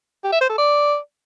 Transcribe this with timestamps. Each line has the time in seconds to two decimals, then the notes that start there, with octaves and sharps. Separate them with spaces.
0.24 G4
0.32 E5
0.41 C5
0.50 A4
0.58 D5